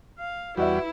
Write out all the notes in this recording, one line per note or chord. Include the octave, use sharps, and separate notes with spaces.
F5
E2 G3 E4 F#4 B4 D5 E5